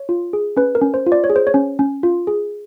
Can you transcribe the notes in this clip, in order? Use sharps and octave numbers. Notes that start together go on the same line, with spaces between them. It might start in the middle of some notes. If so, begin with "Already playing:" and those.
Already playing: C#5
F4
G#4
C#4 B4
A#4
C#4
C5
F4
D5
C#5
G#4
C5
C#5
C#4
C#4
F4
G#4